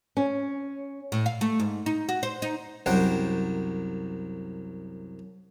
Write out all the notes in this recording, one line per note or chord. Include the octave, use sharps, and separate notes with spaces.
C#4
A2
F5
A3
G#2
D#4
F#4
C5
D#4
C2 F#2 C5 F#5 G5